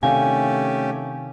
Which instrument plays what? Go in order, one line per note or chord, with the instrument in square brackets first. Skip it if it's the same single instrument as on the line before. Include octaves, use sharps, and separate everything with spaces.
[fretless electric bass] C3 D#3 D4 [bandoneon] A3 C#4 G4 [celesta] F5 [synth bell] G#5